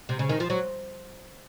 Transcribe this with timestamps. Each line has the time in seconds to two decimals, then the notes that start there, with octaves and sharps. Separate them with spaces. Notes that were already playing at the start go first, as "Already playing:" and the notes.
0.09 C3
0.19 C#3
0.29 D#3
0.40 F3
0.50 F#3